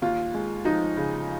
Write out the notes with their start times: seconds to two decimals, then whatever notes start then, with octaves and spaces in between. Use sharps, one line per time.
0.02 D#2 F4
0.34 G#3
0.65 F3 D#4
0.97 C#3